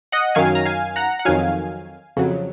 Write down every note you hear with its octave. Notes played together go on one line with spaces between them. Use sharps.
D#5 F#5
F#2 D#3 F#3 F5 G#5
A#5
F5 G#5
F#5 A#5
F#5
F2 D#3 F#3 F5 G#5
F2 C#3 F#3